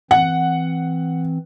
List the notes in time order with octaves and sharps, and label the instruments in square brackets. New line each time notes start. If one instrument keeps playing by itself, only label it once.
[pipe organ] E3 C4 [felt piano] F#5